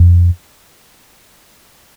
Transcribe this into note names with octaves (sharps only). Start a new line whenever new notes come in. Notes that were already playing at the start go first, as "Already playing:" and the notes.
Already playing: F2